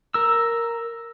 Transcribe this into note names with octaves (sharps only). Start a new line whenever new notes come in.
A#4 E6